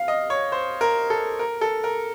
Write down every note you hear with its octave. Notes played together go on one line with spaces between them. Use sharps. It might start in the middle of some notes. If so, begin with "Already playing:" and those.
Already playing: F5
D#5
C#5
C5
A#4
A4
A#4
A4
A#4